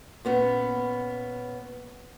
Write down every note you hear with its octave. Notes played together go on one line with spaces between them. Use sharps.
A#2 B3 C#4